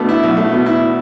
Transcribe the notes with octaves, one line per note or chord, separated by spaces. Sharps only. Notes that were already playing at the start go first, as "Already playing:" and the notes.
Already playing: B2 A3 B3 D4
E4
B1
A3
B2
E4